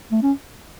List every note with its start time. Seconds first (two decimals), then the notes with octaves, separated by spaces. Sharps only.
0.11 A3
0.23 C#4